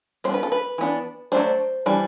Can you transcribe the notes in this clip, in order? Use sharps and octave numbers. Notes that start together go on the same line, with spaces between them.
G3 B3 D4 C5
B4
A4
B4
E3 B3 D4
F#3 A3 D4 C5
E3 G3 D4